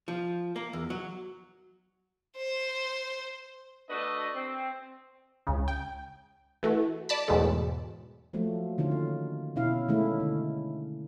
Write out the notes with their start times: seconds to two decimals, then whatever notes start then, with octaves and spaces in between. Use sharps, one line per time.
0.08 F3
0.56 A#3
0.73 E2
0.90 F#3
2.37 C5
3.90 A3 D4 F#4 B4 D#5
4.34 C4
5.47 C#2 C#3
5.68 G5
6.63 E3 A3 F#4
7.09 D5 A5 B5
7.28 E2 G#2 B2 F#3 G#3 A3
8.33 F3 F#3 A3 A#3
8.78 D3 D#3 C#4 F4
8.91 A#3
9.56 B2 C#4 E4 F5
9.88 D#3 G#3 A3 C#4 E4
10.20 D3